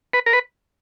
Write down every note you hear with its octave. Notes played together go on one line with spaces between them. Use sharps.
B4
A#4
B4